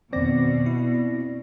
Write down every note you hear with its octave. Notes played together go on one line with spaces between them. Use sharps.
F2 B2 D#3 A#3 C4 D5 A#6
E4